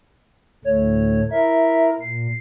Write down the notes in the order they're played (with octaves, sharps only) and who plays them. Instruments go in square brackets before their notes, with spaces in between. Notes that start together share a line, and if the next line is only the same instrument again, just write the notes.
[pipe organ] D2 A2 A3 [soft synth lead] C#5
[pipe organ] E4 A#4 [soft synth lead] E5
[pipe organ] A#2 [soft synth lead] C7